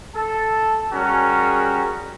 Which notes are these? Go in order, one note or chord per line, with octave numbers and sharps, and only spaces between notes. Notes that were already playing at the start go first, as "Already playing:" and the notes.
A4 A5
G3 C#4 F#4 G#4 A#4